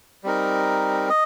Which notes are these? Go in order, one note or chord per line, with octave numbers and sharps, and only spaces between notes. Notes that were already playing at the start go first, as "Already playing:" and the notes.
G3 C4 D#4 A#4
D#5